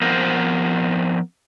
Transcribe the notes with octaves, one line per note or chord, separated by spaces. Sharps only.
F3 B3 C4 A#4 C5